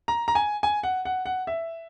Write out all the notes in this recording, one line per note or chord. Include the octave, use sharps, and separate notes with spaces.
A#5
A#5
G#5
G#5
F#5
F#5
F#5
E5